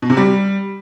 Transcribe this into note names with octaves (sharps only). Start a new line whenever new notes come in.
B2
C3
G3